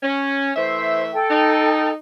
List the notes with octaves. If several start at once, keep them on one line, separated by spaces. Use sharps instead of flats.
C#4
E3 A3 C5 E5
A4 G5
D#4